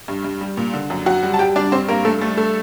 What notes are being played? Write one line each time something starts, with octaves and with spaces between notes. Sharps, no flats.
G2
G2
G3
A#2
D3
F#2
F#2 F#4 F#5
G3
A5
G3 G4 G5
G3 D4 D5
G2 C4 C5
G2 A#3 A#4
G2 A3 A4
G3 A3 A4
A3 A4